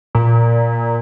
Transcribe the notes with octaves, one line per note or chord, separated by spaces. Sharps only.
A#2